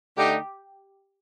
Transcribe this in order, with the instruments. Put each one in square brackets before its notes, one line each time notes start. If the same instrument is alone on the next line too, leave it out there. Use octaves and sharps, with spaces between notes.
[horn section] D3 A3 D#4 [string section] G4